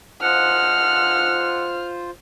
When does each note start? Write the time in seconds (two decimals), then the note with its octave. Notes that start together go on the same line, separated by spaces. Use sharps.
0.22 F3 G#3 F4 C5 F#5 F6